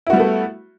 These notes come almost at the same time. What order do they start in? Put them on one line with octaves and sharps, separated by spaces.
E4 F#4 G3 B3 A3